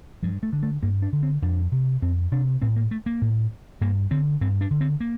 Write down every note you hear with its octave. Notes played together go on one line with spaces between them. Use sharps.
G2 F3
A3
D3
A3
G2 A#3
D4
D3
C4
F2 D4
C3
F2 C4
C3 D4
A2 C4
A#3
A3
A#3
A2
G2 A#3
D3 C4
G2 C4
D4
D3
C4
A#3